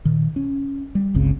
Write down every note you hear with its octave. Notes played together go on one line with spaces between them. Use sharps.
A#2 D#3
C#4
G3
G1 C#2 C#3 C4